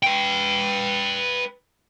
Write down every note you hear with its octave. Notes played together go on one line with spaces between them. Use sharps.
B4 G5